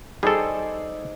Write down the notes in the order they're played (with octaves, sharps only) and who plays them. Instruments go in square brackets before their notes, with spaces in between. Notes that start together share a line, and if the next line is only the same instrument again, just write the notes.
[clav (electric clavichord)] G3 A4 [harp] D#4 C5 D5 [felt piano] G#4